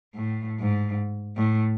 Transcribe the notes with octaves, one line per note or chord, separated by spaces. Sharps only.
A2
G#2
A2